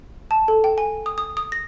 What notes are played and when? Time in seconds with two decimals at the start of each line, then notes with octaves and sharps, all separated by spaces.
0.31 A5
0.48 A4
0.64 G5
0.78 G#5
1.06 D#6
1.18 D#6
1.37 D#6
1.52 A#6